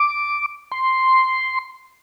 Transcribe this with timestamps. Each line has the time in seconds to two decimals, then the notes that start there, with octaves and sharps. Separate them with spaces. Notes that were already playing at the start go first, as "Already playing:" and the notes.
Already playing: D6
0.72 C6